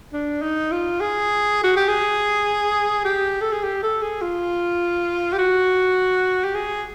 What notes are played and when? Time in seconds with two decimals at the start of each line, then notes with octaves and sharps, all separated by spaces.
0.13 D4
0.42 D#4
0.71 F4
1.01 G#4
1.64 F#4
1.76 G4
1.88 G#4
3.05 G4
3.41 A4
3.52 G#4
3.63 G4
3.83 A4
4.02 G#4
4.22 F4
5.33 G4
5.39 F#4
6.44 G4
6.55 G#4